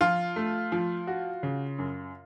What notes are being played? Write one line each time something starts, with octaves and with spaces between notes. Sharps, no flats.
F3 F4
A3
F3
F#4
C#3
F#2